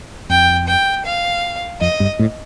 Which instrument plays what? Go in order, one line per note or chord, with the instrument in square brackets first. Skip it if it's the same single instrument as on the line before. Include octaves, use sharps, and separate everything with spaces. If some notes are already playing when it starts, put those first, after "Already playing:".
[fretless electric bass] F2 [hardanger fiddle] G5
[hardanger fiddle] G5
F5
[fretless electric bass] F2 [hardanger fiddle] D#5
[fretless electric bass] G2
A2